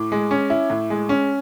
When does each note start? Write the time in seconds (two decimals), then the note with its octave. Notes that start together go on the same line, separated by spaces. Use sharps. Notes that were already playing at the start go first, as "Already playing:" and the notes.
Already playing: A2 D6
0.12 G#3
0.31 C#4
0.50 E4
0.70 A2
0.90 G#3
1.09 C#4